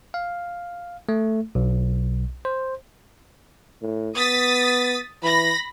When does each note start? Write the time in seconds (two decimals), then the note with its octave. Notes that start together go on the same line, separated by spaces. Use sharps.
0.14 F5
1.09 A3
1.55 B1
2.45 C5
3.82 A2
4.17 B3 D#6 A6 B6
5.23 E3 B5 A#6